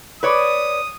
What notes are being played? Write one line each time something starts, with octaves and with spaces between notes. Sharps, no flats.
B4 C#5 D5 D#6